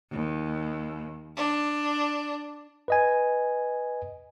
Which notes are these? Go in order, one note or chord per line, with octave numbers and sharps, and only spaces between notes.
D#2
D4
B4 D#5 G#5